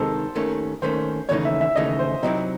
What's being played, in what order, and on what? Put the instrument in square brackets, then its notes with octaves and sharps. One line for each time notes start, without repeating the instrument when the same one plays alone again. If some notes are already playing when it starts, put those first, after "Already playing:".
Already playing: [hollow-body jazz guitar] C3 D#3 G#3 D#4 [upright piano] A4 C5
[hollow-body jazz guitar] D#2 D#3 A3 C#4
[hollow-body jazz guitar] D#2 D#3 A3 C#4 [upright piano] C5
[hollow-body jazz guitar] D#2 C#3 E3 A3 D#4 [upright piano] C#5
[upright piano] E5
E5
[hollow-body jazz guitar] D#2 C#3 E3 A3 D#4 [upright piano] D#5
[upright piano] C5
[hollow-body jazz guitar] C3 F#3 C4 E4 [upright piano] D#4